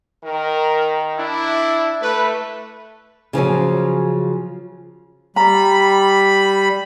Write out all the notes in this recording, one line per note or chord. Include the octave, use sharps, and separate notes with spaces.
D#3 A#4
D4 E4
A3 B4
C#3 F3 F#3 C#4
G3 A#5 B5